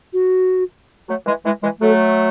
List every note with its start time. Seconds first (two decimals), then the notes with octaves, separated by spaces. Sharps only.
0.13 F#4
1.09 F#3 A3
1.27 E3 G#3
1.45 E3 G#3
1.63 E3 G#3
1.81 F#3 A3 A4